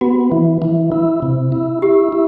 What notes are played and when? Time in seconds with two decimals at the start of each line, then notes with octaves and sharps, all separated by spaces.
0.01 B3 F#4
0.32 E3
0.62 E3
0.92 E4
1.22 C3
1.52 E4
1.82 E4 G4
2.13 E4